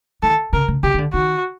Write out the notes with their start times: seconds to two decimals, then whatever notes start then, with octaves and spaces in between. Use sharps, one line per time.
0.23 D#3 A4
0.53 C#3 A#4
0.68 C#3
0.83 C3 G4
0.94 D#3
0.98 D3
1.13 D#3 F#4